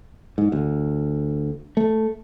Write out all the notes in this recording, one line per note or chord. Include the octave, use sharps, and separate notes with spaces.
G#2
D2
A3